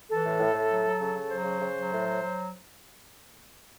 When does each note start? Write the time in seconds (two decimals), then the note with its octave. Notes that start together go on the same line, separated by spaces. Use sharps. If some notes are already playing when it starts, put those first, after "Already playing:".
0.09 E3 A4
0.24 A2
0.40 A2
0.54 A2
0.70 F#3
0.84 F#3
1.00 C#3
1.14 C#3
1.30 F#3 C5
1.44 C#3
1.60 C#3
1.75 F#3
1.90 A2
2.05 F#3
2.20 F#3